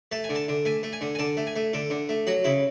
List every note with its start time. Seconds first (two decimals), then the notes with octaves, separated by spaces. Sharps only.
0.12 A3 A5
0.24 G#5
0.29 D3
0.35 A5
0.48 D3
0.65 A3 G#5
0.83 A3
0.93 G#5
1.01 D3
1.15 G#5
1.19 D3 A5
1.37 A3
1.47 G#5
1.56 A3
1.73 D3 A4
1.90 D3
2.09 A3
2.27 F#3 F#4
2.44 C#3 E4